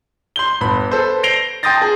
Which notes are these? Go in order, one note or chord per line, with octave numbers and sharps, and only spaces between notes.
C6 G6 G7
G1 B5
A4 B4 C5
A#6 C7 D7 F7 G7
G5 C6 D#6 G6 A6 A#6
G#4 A5